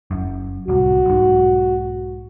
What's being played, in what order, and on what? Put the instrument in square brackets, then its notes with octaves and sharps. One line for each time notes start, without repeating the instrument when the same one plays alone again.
[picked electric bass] F#1 F#2
[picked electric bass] D1 C2 [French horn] F#4
[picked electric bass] B1 G#2